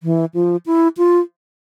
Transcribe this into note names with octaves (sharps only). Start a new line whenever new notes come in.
E3
F3
E4
F4